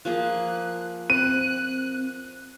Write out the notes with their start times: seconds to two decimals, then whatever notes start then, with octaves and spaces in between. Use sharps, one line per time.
0.05 F3 A#3 G#4 F#6
1.10 C4 F#6 D#7